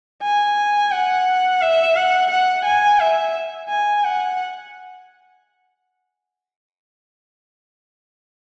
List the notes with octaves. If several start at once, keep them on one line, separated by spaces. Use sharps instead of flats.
G#5
F#5
E5
F#5
F#5
G#5
E5
G#5
F#5